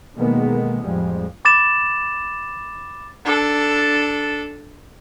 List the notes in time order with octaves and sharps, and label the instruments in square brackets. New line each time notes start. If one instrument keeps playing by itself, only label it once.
[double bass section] B2 D3 D#3 G#3 A#3 B3
A1 F2 F3 G3 G#3
[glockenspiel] B5 D6 A6 E7
[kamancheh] D4 A4